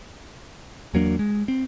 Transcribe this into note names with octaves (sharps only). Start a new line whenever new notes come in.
E2 F#3 A#3 D4
G#3
C4